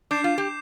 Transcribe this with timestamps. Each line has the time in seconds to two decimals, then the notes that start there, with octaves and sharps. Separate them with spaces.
0.11 D4 D6 G6 C7 E7
0.24 F4
0.38 G4